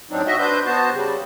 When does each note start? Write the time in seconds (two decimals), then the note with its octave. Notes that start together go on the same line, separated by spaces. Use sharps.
0.10 A2 F#3 C4 D4 D#4
0.27 F#4 D#5 E5
0.39 D4 B4 C5 G6
0.66 B3 F#4 C5 A5
0.91 C#3 G3